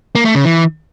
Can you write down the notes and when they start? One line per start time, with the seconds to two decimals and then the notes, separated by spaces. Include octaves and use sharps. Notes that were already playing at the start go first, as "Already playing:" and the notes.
0.15 A#3
0.25 A3
0.35 C#3
0.45 E3